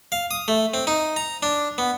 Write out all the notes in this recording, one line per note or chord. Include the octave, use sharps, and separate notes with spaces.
F5
D#6
A3
C4
D#4
A#5
D4
B3